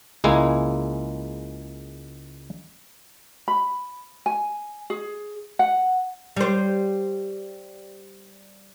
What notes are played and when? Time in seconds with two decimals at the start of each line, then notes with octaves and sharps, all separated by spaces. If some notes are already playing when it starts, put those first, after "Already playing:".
0.24 C#2 G#3 A#3 E4 G#5
3.48 B5
4.26 G#5
4.90 G#4
5.59 F#5
6.37 G3 C5